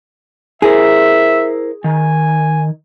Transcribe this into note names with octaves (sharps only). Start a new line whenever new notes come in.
E4 G#4 A#4 C5 E5
D#3 G#5